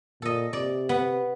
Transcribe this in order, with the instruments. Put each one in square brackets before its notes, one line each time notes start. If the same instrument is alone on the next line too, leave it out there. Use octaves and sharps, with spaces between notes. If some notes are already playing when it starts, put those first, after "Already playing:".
[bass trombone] A#2 [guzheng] A4 D#5
[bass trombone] C3 [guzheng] D5
[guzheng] B3